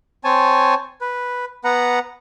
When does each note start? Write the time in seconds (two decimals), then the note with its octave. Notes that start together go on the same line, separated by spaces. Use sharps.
0.24 C4 C#5 G#5 A5
1.01 B4
1.64 B3 B4 F#5 A#5